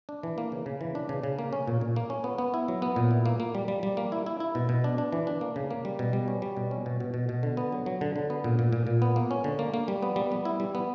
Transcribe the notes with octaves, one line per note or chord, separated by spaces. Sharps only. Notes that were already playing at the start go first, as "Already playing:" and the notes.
D4
E3
A#3
C#3
C#3
E3
D4
C#3
C#3
A#3
C#4
A#2
A#2
A#3
C#4
B3
B3
E4
F#3
B3
A#2
E4
A#3
A#3
G3
G3
G3
A#3
E4
E4
E4
B2
B2
D4
D4
E3
D4
A#3
C#3
A#3
G3
B2
G3
C#4
G3
B2
C#4
B2
B2
B2
B2
D3
B3
F#3
F#3
D3
D3
B3
A#2
A#2
A#2
A#2
B3
A#3
C#4
D3
A#3
A#3
G3
B3
G3
B3
E4
G3
B3